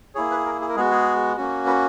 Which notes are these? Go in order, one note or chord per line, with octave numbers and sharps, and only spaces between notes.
A#3 E4 G#4 C#5
B4
A#4
G#4
A#4
G#3 B3 F#4 G#4
G#4
A#3 C#4 F#4
B4